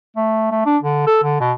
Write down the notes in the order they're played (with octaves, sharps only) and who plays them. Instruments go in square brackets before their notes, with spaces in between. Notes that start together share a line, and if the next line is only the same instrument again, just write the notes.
[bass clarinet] A3
A3
D4
D3
A4
D3
B2